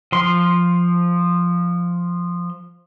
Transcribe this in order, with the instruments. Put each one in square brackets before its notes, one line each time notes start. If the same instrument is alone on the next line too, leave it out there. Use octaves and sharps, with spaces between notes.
[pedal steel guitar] F3 C6